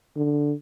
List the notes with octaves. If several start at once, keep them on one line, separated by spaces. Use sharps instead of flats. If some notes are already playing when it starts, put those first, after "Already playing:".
D3